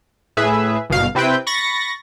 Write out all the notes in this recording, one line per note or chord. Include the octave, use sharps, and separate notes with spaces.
A2 G#4 B4 E5
G1 B2 F5
C3 C4 E4 B4 G5 G6
B5 C#6 A6 A#6